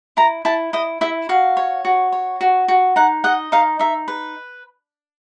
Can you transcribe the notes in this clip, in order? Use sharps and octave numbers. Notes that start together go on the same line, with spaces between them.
E4 A#5
E4 A5
E4 D#5
E4 E5
F#4 F5
C#5
F#4
C#5
F#4
F#4
D#4 F#5
D#5 F#5
D#4 F5
D#4 E5
B4